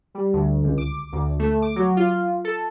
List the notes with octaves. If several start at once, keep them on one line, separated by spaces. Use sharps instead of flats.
G3
D2
C#2
D6
D2
A3
D6
F#3
F4
A4